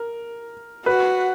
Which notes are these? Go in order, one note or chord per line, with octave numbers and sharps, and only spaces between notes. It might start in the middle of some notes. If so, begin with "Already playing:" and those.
Already playing: A#4
F#4 B4